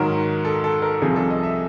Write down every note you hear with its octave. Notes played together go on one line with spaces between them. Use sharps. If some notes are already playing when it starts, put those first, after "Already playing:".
Already playing: G#2 D#3 F#3 A#4
A4
A4
A#4
C2 C3 F3 G#4
A4
D#5
E5